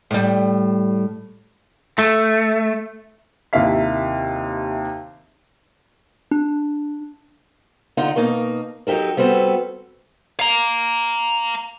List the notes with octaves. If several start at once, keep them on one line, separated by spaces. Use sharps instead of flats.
A2 G3
A3
D#2 C3 E4 F5 B6
D4
D3 D#4 F4 F#5 A#5
B2 A#3 D#4 A#4
F#3 D#4 G4 A4 A#4
G3 B3 C4 F#4 A4
F5 A#5